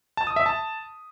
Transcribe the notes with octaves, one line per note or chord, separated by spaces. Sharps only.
A5
D#6
E5
A5